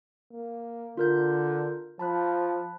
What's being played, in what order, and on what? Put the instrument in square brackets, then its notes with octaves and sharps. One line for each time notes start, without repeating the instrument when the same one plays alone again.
[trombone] A#3
[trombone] D3 [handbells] F4 A#4 G6
[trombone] F3 [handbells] A5 B5 F#6